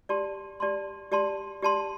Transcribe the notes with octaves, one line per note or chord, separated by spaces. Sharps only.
G4 D5 A5 C6
G4 D5 A5 C6
G4 D5 A5 C6
G4 D5 A5 C6